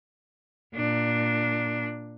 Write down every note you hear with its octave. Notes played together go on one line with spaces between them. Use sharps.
A#2 D4